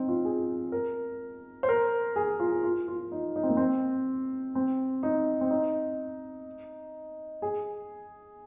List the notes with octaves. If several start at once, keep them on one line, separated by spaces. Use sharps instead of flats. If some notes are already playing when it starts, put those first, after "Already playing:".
Already playing: C4 D#4
F4
G#4
A#4
C5
A#4
G#4
F4
G#4
F4
F4
D#4
D#4
C4
A#3
C4
C4
D#4
C4
D#4
G#4